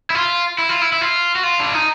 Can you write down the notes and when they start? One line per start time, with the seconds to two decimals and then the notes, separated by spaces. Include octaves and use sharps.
0.10 E4
0.15 F4
0.58 E4
0.69 F4
0.82 E4
0.93 E4
1.01 F4
1.36 F#4
1.43 F4
1.60 D4
1.74 D#4